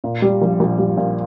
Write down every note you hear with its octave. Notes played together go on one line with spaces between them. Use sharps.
A#2
G3
A#1
A#1
G3
A#2